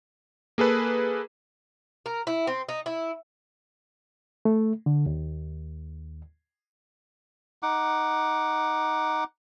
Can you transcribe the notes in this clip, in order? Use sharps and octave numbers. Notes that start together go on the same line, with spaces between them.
A#3 G#4 A4 B4
A#4
E4
C4
D#4
E4
A3
D3
D#2
D#4 F#5 D6